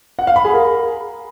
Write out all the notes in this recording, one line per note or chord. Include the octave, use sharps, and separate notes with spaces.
F#5
F5
B5
G#4
A#4